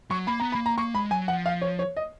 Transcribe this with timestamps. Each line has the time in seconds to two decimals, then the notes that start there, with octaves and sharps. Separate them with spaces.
0.10 F#3 C#6
0.27 A#3 B5
0.40 B3 A#5
0.52 B5
0.55 A#3
0.66 A#5
0.78 A#3 C#6
0.94 G#3 B5
1.11 F#3 G#5
1.28 F3 F#5
1.46 F5
1.62 C#5
1.79 C#5
1.97 D#5